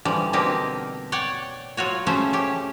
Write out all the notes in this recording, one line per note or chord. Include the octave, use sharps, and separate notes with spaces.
D3 E3 F3 G3
B2 D3 A#3 C4 D#4 G4
C#5 D5 F#5 G5
F#3 F4 F#4 C#5
C#3 F3 A3 C#4 C5 E5
C#4 G4